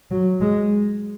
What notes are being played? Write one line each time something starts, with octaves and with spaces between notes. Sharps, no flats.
F#3
G#3